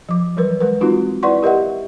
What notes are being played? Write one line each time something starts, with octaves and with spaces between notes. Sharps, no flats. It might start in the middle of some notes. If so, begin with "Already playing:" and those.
F3 D6
E3 F#3 G3 A#4 B4
G#3 A#4 B4
G#3 C4 D#4 F4 F#4
E4 B4 D5 F#5 C6 C#6
G4 A#4 D#5 E5 F#5